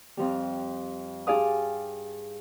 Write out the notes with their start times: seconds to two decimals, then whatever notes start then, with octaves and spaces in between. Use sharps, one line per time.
0.17 F2 F3 G3
1.27 G2 G#4 D5 F5 D#6